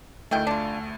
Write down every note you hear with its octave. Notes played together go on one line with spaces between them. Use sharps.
D2 D#3 A3 E4 G5
D4 F4